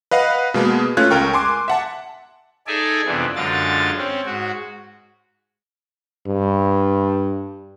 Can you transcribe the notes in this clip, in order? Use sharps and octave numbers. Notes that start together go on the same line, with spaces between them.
B4 D#5 F5 F#5
B2 G#3 A#3 B3
A3 C#4 F4 F#6 G#6
C#2 A#4 G5 C#6
G#5 C6 D6
E5 F#5 A5
D#4 G#4 A4 D5 E5 G#5
F2 C3 E3 B3 D4
F#2 D3 G#3 F4 A6
C4 C#4
G#2 F#4
G2